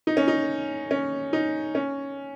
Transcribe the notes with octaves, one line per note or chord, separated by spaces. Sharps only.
D#4
C#4
D#4
C#4
D#4
C#4